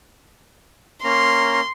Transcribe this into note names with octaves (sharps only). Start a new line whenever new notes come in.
A#3 C#4 A#5 C6